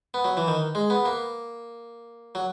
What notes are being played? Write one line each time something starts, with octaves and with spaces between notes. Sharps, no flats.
B3
F#3
E3
D#3
G#3
B3
A#3
F#3